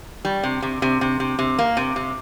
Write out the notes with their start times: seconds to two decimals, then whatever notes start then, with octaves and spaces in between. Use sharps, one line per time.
0.25 G3
0.44 C3
0.62 C3
0.82 C3
1.01 C3
1.20 C3
1.39 C3
1.59 A#3
1.77 C3
1.96 C3